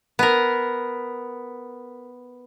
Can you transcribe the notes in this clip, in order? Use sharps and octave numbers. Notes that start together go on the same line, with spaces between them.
B3 A#4